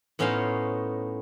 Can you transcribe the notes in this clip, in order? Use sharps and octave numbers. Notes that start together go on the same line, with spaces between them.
A2 B3 C#4 D#4 C5 F5